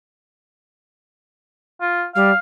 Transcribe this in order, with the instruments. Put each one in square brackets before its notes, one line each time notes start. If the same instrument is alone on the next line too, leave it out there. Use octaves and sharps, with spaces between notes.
[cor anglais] F4
[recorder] G3 [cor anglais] F5